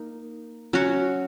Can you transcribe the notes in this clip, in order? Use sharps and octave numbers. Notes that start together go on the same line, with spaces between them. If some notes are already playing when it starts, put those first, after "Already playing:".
Already playing: A#3 D#4
F#3 C#4 F#4